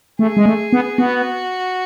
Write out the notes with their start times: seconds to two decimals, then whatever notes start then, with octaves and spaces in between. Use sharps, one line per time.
0.19 A3 G#4
0.37 G#3
0.46 A3
0.73 B3
0.98 B3 F#4